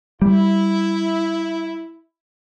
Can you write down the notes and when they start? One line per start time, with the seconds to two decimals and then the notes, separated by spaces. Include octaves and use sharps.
0.22 G3 E4